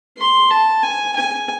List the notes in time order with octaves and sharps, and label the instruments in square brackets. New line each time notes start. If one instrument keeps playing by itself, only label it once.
[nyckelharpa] C6
A5
G#5
G#5